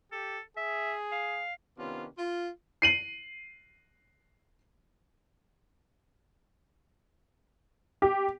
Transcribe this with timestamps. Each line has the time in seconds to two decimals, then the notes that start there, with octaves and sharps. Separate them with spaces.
0.12 G4 A4
0.57 G#4 E5
1.12 F5
1.79 C3 D#3 B3 C#4 D4 F4
2.18 F4
2.82 C7 D#7 F#7
8.02 G4